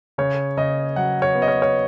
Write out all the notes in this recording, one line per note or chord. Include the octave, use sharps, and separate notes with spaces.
C#3 C#5
C#3 D#5
F#3 F#5
C#5
B3
D#5
C#5
C#5